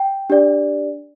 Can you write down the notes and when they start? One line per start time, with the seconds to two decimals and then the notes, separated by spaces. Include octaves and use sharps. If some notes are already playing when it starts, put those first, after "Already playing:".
Already playing: G5
0.30 D4 G4 D5